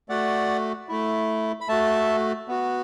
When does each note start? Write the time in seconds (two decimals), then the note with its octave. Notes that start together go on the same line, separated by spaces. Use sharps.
0.09 A3 F#4 D5 F#5
0.89 A3 E4
1.61 B5
1.68 A3 F#4 E5 A5
2.48 B3 F#4